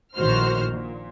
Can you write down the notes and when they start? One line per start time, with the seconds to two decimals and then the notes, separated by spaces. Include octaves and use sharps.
0.15 A#1 A2 D#3 F#4 C5 F6
0.71 A#2